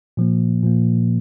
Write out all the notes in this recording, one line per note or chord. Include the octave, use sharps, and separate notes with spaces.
A#2 F3 A#3
A#2 F3 A#3